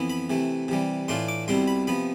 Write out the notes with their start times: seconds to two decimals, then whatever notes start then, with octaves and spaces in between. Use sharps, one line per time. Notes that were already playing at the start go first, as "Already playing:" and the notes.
Already playing: F2 E3 B3 E4
0.10 B5
0.30 C3 E3 A3
0.68 C3 E3 G3
1.08 A2 E3 A3 D4 F4 C6
1.28 D6
1.48 C2 B2 G3 C4 E4 C6
1.68 B5
1.87 C3 F3 B3 B5